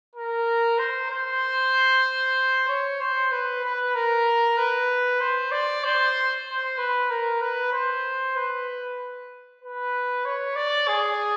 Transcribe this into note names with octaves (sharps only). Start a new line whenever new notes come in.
A#4
C5
C5
C#5
C5
B4
B4
A#4
B4
C5
D5
C5
C5
B4
A#4
B4
C5
B4
B4
C#5
D5
G#4